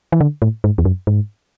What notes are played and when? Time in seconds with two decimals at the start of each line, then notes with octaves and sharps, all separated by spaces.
0.12 E3
0.21 D3
0.42 A2
0.64 G#2
0.78 E2
0.85 F#2
1.07 G#2